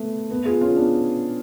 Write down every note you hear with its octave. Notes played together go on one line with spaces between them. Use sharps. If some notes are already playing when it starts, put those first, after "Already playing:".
Already playing: A3 B3
B3
F4 G#4
C#4 F4
B3 D4